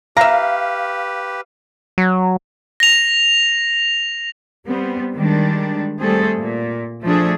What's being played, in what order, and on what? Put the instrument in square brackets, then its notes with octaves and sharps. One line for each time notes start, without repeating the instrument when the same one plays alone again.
[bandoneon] G4 B4 [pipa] E5 A#5 [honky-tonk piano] F5
[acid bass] F#3
[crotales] A#6 F7
[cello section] G3 B3 C4
D#3 G3 G#3 D4
G3 A3 C4 G#4 A4
A#2
F3 A3 D4 G#4 A4